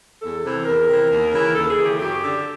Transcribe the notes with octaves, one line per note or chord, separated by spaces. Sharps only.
E2 A4
C3 E3
E2 A#4
C3 E3
D#2
C#3 E3
D#2 A4
G#4
C#3 E3
G4
F#2 G4
D3